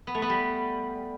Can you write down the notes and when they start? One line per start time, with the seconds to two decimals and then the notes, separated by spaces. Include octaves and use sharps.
0.07 B3
0.15 A3
0.22 B3
0.30 G3